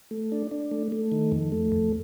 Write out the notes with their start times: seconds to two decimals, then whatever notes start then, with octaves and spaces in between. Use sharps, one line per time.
0.11 A3
0.32 D4
0.51 D4
0.71 A3
0.92 A3
1.12 D#3
1.32 F2
1.52 A3
1.72 F2